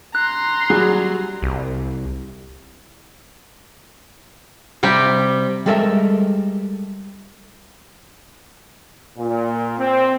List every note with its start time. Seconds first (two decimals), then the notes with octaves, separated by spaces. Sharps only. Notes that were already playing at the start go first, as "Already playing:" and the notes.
0.15 A#5 C6 F#6
0.70 F#3 G3 G#4
1.43 C2
4.83 C3 G3 G5
5.66 G3 G#3 A4 A#4 D#5 E5
9.17 A#2
9.78 C4